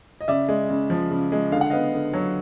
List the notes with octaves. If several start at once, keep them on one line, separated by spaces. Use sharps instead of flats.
D#5
C#3 D5 E5
G#3
C#3
F3
C#3
G#3
D3 F5
F#5
B3 D#5 F5
D3
F#3